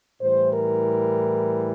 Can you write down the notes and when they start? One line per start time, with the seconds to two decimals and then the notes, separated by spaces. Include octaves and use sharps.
0.21 A2 E3 G3 C5
0.52 A#4